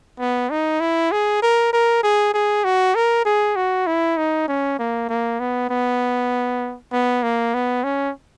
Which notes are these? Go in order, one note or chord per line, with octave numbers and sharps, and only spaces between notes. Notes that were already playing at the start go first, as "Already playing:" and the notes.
B3
D#4
E4
G#4
A#4
A#4
G#4
G#4
F#4
A#4
G#4
F#4
E4
D#4
C#4
A#3
A#3
B3
B3
B3
A#3
B3
C#4